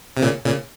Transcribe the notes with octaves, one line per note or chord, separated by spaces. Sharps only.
C3
A#2 C#3
A#2 C#3